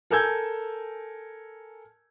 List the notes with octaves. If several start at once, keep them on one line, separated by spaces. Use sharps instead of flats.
A4 A#4 G#5 E6 G6 G#6